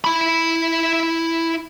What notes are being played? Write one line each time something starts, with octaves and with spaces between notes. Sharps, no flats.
E4 B5